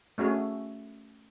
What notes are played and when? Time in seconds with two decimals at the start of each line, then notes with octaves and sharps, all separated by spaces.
0.18 A3 C#4 F#4 G#4